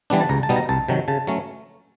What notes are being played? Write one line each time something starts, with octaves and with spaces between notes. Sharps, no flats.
E3 G3 B3 D4
A5
C#2 A#5
A5
B2 G3 B3 D#4
A#5
C2 A5
C3 D#3 F#3
C#3 A5
F#3 A3 C#4